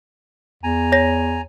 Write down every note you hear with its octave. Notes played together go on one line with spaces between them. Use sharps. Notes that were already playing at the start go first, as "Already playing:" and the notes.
E2 G#5 A#5
C#5 A#6